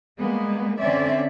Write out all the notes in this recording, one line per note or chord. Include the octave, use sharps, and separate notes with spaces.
G3 G#3 A#3 B3
D3 C4 C#4 D5 E5